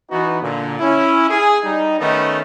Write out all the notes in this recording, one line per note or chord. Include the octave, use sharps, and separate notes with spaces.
E3 B3 D#4 F#4
A#2 D3
C#4 E4
G#4
G3 D#4
D#3 A3 B3 C#4 D#4